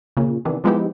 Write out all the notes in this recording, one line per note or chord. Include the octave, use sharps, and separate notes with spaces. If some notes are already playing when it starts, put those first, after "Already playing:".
A#2 C#3
C3 D#3 E3 B3 D4
F3 G#3 B3 D#4 E4 G4